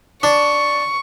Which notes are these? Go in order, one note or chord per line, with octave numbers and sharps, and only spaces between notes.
D4 C#6